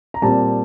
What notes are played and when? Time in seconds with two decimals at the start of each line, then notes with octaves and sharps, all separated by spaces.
0.14 A#5
0.22 A#2 G3 C4 A5